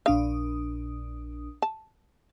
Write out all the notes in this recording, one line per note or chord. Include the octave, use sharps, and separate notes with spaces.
A#1 D4 F5 D#6
A5